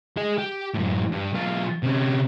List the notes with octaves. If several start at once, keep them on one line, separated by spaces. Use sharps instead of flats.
G#4 D#5
G4
F#2 A2
G2
B1 F4
C3 C#4